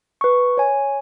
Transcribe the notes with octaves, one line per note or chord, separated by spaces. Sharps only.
B4 C#6
C#5 G#5